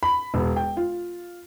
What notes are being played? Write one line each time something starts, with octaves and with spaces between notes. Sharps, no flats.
B5
E1
G5
F4